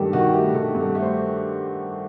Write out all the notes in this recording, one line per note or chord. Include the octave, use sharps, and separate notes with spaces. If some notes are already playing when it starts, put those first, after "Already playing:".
Already playing: G2 D#3 G4 A4
D#3 F#4
A3 G4
D#3 A4
G2
A4
A3
C5